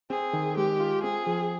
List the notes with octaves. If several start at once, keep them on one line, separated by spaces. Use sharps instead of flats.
C4 G#4
D#3
G#3 G4
F4
C4 G#4
F3